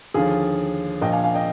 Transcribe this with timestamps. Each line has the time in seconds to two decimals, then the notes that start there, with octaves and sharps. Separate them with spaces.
0.14 D#2 D3 F3 F4 G#4
1.01 A#1 A#2 F3 D#5 G5
1.13 F5 G#5
1.23 F5 G#5
1.34 D#5 G5